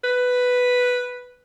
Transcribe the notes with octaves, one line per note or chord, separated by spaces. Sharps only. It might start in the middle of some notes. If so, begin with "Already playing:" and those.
B4